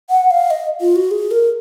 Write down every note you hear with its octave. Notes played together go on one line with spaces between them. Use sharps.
F#5
F5
D#5
F4
F#4
G#4
A#4